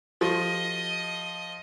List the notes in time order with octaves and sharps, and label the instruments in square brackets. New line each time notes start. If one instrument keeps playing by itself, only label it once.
[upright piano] F3 [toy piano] F#4 G4 A4 [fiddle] D#5